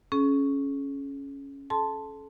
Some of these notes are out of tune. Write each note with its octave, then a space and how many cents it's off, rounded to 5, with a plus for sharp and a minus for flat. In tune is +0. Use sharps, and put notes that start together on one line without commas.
C#4 +0 G#4 +40
A4 -35 A5 +0 C6 +0